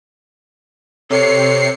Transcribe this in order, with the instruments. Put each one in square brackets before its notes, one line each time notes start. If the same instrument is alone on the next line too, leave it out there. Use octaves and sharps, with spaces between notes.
[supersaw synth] C3 C7 C#7 [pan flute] A4 [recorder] C#5